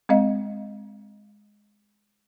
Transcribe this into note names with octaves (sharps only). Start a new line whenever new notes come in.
G#3 C4 D#5 F5